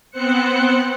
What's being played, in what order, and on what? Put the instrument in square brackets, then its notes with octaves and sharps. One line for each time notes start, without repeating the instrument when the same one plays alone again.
[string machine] B3 C4 C5 F#6 C#7